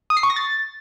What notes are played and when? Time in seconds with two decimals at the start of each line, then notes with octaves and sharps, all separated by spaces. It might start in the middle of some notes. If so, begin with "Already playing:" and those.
0.10 D#6
0.17 C7
0.23 C#6
0.30 A#6
0.36 A6